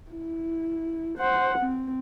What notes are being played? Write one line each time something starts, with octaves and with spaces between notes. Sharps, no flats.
E4
C5 F#5
C4